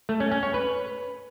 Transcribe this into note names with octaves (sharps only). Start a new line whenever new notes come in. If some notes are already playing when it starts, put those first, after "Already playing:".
A3
C#4
C#4
C#5
B4